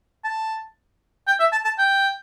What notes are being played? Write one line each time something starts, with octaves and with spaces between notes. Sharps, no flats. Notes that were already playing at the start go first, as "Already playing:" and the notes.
A5
G5
E5
A5
A5
G5